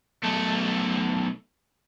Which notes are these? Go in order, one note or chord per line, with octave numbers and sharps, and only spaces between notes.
B1 A3